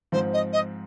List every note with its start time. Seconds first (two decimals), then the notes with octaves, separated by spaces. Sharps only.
0.12 G#2 F3 C4 C5
0.33 D#5
0.52 D#5